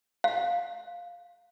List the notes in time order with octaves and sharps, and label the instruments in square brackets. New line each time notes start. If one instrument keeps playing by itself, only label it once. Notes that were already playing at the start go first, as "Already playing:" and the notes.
[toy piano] F5